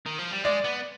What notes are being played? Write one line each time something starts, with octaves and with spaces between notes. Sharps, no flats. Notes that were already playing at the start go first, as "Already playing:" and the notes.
D#3
F3
G3
G#3 D5
B3